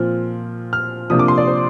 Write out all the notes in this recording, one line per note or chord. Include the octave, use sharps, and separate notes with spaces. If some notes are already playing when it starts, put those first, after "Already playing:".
Already playing: A#2 F3 C4 F6
F6
C3 F3 A#3 D4 D#6
D6
C6
D5
C5